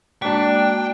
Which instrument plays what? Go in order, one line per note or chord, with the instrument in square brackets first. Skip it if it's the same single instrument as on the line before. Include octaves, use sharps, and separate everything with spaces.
[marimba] G#3 A#3 F#4 [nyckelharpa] D4 [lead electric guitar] G5